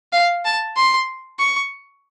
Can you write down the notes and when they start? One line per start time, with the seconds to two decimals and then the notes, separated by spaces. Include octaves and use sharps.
0.12 F5
0.45 A5
0.77 C6
1.39 C#6